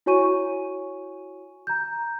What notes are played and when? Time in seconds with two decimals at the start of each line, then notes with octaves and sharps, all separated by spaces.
0.06 E4 F#4 C#5 G#5 C#6 D#7
1.67 A#5 G6